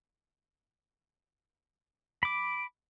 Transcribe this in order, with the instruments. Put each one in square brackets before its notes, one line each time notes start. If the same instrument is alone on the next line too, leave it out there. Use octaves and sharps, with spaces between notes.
[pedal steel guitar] B5 D6 [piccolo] D7